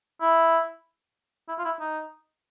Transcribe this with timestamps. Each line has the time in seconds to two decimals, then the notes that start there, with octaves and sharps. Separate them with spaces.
0.21 E4
1.49 E4
1.59 F4
1.65 E4
1.80 D#4